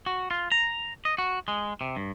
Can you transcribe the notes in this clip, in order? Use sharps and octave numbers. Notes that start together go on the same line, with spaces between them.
F#4
F4
A#5
D#5
F#4
G#3
C3
G2